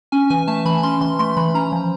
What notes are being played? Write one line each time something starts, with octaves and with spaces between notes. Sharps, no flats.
C#4 G#5
E3 G#5
A3 A5
E3 B5
C#4 C6
E3 C6
A3 C6
E3 B5
C#4 A#5
F3